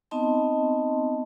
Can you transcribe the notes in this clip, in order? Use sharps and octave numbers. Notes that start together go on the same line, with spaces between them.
B3 C4 D#4 D#5 A5 C6